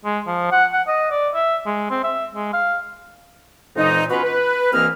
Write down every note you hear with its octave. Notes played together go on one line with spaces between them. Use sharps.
G#3
F3
F#5
F#5
D#5
D5
E5
G#3
C4
E5
G#3
F5
F2 A#2 E3 G#3 D#4
B3 C#4 F4 F#4 B4
B4
C2 E3 A#3 C4 D#5 F6